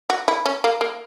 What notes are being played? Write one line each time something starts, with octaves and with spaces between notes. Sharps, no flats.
F#4
E4
C#4
A#3
A#3